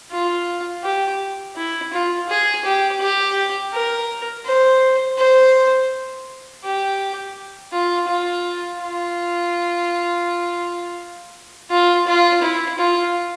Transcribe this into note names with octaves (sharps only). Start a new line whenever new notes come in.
F4
G4
E4
F4
G#4
G4
G4
A#4
C5
C5
G4
F4
F4
F4
F4
F4
E4
F4